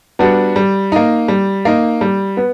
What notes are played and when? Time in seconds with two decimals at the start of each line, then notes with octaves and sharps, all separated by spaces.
0.19 G3 B3 D4 F#4
0.56 G3
0.92 A#3 D#4
1.28 G3
1.65 A#3 D#4
2.01 G3
2.37 B3